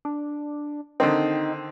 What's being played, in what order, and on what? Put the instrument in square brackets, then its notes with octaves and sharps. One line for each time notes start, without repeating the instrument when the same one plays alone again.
[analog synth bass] D4
[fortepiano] D3 D#3 C4 [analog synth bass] D#4